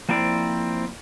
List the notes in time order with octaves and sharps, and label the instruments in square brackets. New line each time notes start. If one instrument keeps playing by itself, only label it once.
[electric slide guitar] F3 A#3 C4 E4 D5